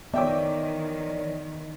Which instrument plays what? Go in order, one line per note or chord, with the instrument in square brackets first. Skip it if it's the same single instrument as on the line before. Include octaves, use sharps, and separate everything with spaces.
[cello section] D#3 E3 [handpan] B3 [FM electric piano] C#5 D5 [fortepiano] E5 G5 D6